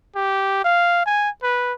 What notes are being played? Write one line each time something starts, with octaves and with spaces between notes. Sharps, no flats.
G4
F5
G#5
B4